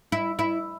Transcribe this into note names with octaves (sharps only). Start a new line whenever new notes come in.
E4
E4